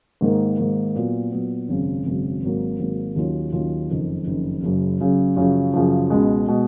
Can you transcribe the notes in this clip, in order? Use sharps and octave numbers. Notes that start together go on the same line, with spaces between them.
G#2 D#3 A#3
G#2 D#3 A#3
A#2 F#3 B3
A#2 F#3 B3
G#1 F#2 C#3
G#1 F#2 C#3
G#1 G#2 F#3 A#3
G#1 G#2 F#3 A#3
D#2 D#3 F#3 C#4 F4
D#2 D#3 F#3 C#4 F4
F#1 F2 D#3
F#1 F2 D#3
F#1 F#2 C#3
F#1 F#2 C#3
F#2 C#3 F3
F#2 C#3 F3
C#2 B2 G#3
B2 G#3